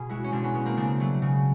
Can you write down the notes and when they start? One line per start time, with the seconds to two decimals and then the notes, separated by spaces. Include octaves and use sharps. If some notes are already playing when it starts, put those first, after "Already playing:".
Already playing: B2 G#4
0.09 G#3 E4 F#4
0.24 C#4
0.32 B2 C4 D4
0.44 B3 C#4
0.54 G#3 B3
0.66 A#3 C4
0.77 C#3 C4 D4
1.00 F#3 A3
1.22 C#3